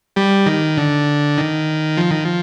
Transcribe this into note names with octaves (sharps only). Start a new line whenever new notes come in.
G3
D#3
D3
D#3
F3
D#3
F3